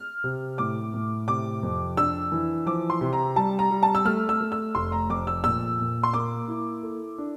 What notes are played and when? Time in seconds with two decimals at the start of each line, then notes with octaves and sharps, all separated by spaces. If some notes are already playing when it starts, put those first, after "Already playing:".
Already playing: F6
0.24 C3
0.58 A2 D6
0.94 A2
1.28 C3 D6
1.63 F2
1.97 D4 E6
2.32 E3
2.66 F3 D6
2.90 C6
3.01 C3
3.13 A#5
3.36 G3 A5
3.59 A#5
3.71 G3
3.83 A5
3.95 E6
4.05 A3 F6
4.29 E6
4.41 A3
4.52 E6
4.75 F1 C6
4.92 A#5
5.09 F2 D6
5.27 E6
5.44 A#2 E6
5.79 A#2
6.03 C6
6.13 A#3 D6
6.48 E4
6.83 A4
7.18 D4